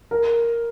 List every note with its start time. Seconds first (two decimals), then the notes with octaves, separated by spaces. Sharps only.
0.11 A#4